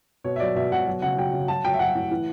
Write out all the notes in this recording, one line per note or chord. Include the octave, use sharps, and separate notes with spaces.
B2 C#5
E5
F#3 D5
B2 E5
B2 F#5
F#3
C#3 F#5
F#3 G5
C#3
F#3 A5
F#3 G5
E5
F#3 F#5
A2
E3